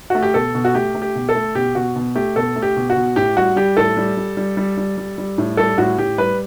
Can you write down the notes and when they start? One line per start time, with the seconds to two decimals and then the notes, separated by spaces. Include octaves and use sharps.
0.10 A3 F#4
0.23 G4
0.34 B2 A4
0.55 B2
0.64 F#4
0.75 A3 G4
0.95 A3
1.02 G4
1.15 B2
1.29 A4
1.35 A3
1.55 B2 G4
1.75 B2 F#4
1.96 B2
2.15 A3 G4
2.36 B2 A4
2.56 A3
2.62 G4
2.76 B2
2.90 F#4
2.96 B2
3.16 A2 G4
3.36 G3 F#4
3.56 G3 G4
3.77 A2 A4
3.97 G3
4.17 G3
4.37 G3
4.57 G3
4.77 G3
4.98 G3
5.18 G3
5.38 A2
5.57 G3 A4
5.78 A2 F#4
5.98 A2 G4
6.18 G3 B4